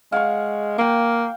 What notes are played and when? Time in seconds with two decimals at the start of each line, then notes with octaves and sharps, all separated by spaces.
0.12 G#3 F5 F#5 C#6
0.78 A#3 F5 G5